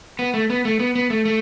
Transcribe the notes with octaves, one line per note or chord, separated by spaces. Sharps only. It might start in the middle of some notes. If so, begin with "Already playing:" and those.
B3
A3
B3
A3
B3
B3
A3
A3